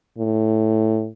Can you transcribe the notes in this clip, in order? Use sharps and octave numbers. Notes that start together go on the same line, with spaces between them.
A2